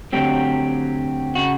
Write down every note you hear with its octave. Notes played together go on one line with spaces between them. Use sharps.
D3 F#3 A3 C4 G4
C#3 F#4